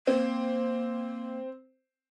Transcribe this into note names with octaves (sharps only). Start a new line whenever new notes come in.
A#3 C4